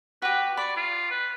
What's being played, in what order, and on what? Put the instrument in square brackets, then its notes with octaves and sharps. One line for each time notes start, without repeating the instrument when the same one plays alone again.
[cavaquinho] F#4 G4 [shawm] B4
[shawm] D5 [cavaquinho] B5 C#6
[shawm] F4
B4